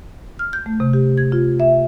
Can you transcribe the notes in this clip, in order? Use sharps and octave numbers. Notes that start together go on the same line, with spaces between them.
F6
G6
A3
C3
G4
G#6
F4
E5